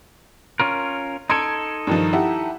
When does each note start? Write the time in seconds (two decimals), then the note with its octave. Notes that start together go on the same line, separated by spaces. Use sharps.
0.60 C#4 F4 A#4
1.30 D#4 A4 C6 G#6 D7
1.87 G2 D#3 F3
2.13 E4 G4 F#5